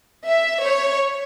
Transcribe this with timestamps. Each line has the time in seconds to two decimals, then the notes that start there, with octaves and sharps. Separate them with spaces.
0.26 E5
0.63 C#5